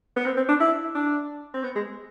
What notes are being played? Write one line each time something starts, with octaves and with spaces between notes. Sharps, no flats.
B3
C4
C4
D4
E4
D4
C4
B3
G#3